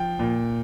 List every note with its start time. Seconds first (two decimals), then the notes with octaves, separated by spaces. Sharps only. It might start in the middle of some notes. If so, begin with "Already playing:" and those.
Already playing: F3 G5
0.19 A#2